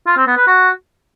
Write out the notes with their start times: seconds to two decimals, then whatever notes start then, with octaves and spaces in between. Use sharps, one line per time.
0.07 F4
0.17 C4
0.27 B3
0.37 B4
0.47 F#4